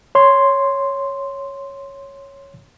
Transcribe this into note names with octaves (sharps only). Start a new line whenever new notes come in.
C#5 C6